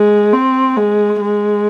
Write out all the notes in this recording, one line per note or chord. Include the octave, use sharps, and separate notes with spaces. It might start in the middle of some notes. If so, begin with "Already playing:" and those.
Already playing: G#3
C4
G#3
G#3